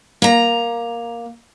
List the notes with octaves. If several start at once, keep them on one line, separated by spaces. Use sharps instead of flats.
A#3 A#5